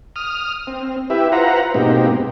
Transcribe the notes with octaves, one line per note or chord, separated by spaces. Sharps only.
D#6 F6
C4
E4 G4 B4 E5
F4 B4 C5 F#5 A#5
G#2 B2 A#3 C4 D#4 G4